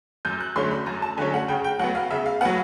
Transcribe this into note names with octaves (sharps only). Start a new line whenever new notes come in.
F#2 G6
F#6
D3 F#3 A3 C#4 C6
B5
F#2 A#5
A5
D3 F#3 A3 C#4 G#5
F#5
C#3 G5
G5
F#3 B3 F#5
F5
C#3 E5
F5
F#3 B3 F#5